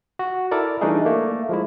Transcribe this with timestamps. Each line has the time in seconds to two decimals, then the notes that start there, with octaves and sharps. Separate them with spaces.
0.19 F#4
0.51 E4 A4 A#4 D5
0.81 E3 G3 A3 D4 D#4 G#4
1.06 A3 A#3
1.49 F3 G#3 E4